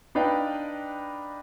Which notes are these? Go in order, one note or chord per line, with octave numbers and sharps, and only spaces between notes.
D4 D#4 B4 D#5 F5 G5